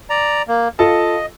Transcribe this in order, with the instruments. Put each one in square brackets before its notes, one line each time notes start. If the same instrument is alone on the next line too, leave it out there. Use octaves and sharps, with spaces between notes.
[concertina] D5 A#5
A#3
[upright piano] F4 A4 A5 [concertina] D#5